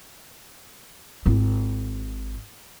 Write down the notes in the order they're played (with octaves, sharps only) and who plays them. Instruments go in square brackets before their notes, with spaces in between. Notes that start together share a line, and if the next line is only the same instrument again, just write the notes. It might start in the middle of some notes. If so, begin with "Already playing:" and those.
[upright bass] G#1 E4